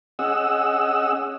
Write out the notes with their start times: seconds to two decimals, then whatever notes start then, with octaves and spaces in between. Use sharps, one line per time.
0.19 C#4 G#4 D#5 F#5 E6